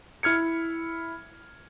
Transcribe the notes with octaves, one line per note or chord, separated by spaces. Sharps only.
E4 F6 G#6 C#7